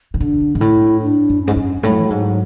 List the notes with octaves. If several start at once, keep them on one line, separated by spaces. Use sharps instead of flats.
C#3
D3 D4
G#2 D4
A2 E4
D4
F#2
G#2 C#4
F#2
A2 G#3
F#3
E3
F#3
G#2